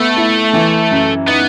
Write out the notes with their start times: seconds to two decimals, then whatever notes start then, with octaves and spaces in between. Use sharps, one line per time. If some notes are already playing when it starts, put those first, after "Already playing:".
Already playing: A3 B3
0.16 E4
0.53 E3
0.91 F#2
1.28 B3 D#4